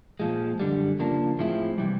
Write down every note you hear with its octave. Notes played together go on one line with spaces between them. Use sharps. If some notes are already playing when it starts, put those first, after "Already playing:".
A#2 F3 G#3
F#2 D3 G3
C#3 F3 A#3 D4
A2 F3 G#3 C4 E4
C3 E3 G3